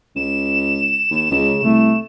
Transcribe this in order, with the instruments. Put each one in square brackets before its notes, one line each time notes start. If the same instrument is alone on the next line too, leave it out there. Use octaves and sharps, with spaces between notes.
[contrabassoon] C#2 [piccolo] E7
[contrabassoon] D#2
[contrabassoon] C#2 [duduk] C#3
[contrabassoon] C2 [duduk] A3